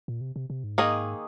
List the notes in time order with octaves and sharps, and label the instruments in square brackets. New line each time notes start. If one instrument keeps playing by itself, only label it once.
[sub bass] A#2
C3
C3
C3
G#2
[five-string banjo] D#3 A#3 G#4 D#5